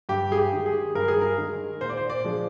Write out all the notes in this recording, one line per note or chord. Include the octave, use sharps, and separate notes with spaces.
G2 G4
G#4
G4
D#3 G#3
G#4
G2 A#4
G#4
A#4
D#3 G#3
A#2 C5
D5
C5
D5
F3 G#3 D4